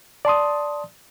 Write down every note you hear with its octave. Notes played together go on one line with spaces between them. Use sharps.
D5 A5 C6 D#6